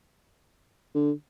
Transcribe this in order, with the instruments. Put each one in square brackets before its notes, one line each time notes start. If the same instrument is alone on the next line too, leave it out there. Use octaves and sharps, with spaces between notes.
[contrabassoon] D3